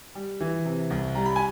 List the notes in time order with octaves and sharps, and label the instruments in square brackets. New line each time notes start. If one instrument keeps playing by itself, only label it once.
[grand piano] G3
E3
C3
C2
G3 A#5
B5
G#5